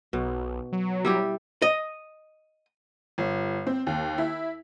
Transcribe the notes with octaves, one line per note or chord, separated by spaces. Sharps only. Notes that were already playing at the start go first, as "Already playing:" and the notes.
B1 B2
F#3
G3 E4 G4
D#5
G1
C4
D#2
E4